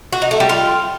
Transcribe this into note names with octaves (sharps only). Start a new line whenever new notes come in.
F#4
D#4
A3
G3
F4